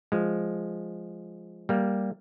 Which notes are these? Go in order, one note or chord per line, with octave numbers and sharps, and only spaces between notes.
F3 G#3
G3 A#3